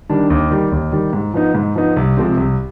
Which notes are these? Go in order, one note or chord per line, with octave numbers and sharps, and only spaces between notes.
D#3 G3 D4
D#2
D#3 G3
D#2
D#3 G3
G#2
F3 B3 D#4
G#2
F3 B3 D#4
C2
C3 F3 G#3 C4
C2